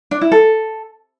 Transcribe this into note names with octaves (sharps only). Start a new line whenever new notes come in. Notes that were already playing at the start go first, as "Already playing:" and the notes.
D4
E4
A4